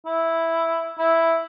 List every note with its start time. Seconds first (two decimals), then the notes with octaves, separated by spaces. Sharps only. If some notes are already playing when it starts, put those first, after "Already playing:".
0.06 E4
0.99 E4